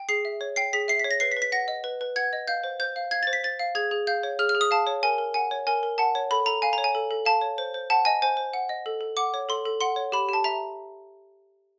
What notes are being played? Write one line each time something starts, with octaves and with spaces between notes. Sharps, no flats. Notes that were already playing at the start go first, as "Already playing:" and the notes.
Already playing: G5
G#4 C7
E5
C#5
G5 C7
G#4 B6
E5 C7
B6
C#5
A#6
B4 C7
B6
B4
B6
F#5 A#6
D#5
B4
B4
F#5 G#6
D#5
F5 G6
C5
C5 G6
F5
F5 G#6
A6
C5
B6
C5 A6
F5
G#4 G#6
G#4
F5 G6
C#5
G#4 F6
F6
G#4
D#6
F5 A5
C#5
A#4 G#5
A#4
F#5 G#5
C#5
A#4 G#5
A#4
F#5 A5
C#5
A4 B5
A4 A#5
F5 G#5
A#5
C#5
G#5
A4
A4
F5 A5
C#5
C5
C5
F#5 A5
D#5 G#5
C5 G#5
C5
F#5
D#5
A4
A4
F#5 D6
C#5
A4 C6
A4
F#5 C6
C#5
G4 B5
G4 A5
E5 A#5